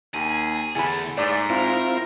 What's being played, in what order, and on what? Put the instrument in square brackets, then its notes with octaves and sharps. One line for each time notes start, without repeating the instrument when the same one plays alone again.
[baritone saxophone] D#2 [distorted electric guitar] G#4
[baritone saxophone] E2 [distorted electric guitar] D3 A3 [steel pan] G#5 B5
[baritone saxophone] G#2 [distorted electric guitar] A3 [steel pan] D5
[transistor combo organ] C4 E4 F4 [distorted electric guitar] A#4